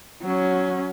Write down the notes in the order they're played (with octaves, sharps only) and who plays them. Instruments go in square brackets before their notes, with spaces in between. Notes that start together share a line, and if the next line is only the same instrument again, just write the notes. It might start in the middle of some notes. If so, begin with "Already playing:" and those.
[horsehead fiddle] F#3 C#4